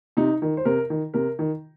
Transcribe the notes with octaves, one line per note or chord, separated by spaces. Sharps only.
C3 D#4
D#3
C5
C3 A#4
D#3
C3 A#4
D#3